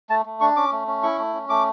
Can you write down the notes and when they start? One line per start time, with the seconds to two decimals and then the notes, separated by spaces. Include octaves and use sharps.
0.10 A3 A5
0.26 A3
0.41 D4 C#6
0.56 C#4 D6
0.72 A3
0.87 C#4
1.03 E4 C#6
1.19 A3
1.34 C#4
1.49 A3 D6